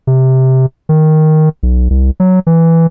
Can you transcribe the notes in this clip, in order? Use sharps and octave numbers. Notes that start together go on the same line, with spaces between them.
C3
D#3
B1
C2
F#3
E3